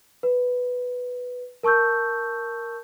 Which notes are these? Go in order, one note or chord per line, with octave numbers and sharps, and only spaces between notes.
B4
A#4 A5 C#6 E6 G6